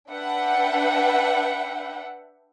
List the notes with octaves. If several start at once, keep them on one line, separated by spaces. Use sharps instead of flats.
D4 B4 E5 F#5 G5